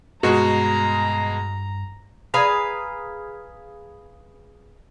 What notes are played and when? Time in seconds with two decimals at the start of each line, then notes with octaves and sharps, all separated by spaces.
0.23 G2 B2 G#3 F#4 A#5
2.34 G#4 B4 F5 A#5